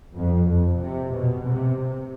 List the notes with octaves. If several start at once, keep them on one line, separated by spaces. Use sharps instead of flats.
F2
F2
C3
B2
C3